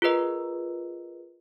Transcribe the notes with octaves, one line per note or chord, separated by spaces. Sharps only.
F4 G#4 A#4 B4 D#5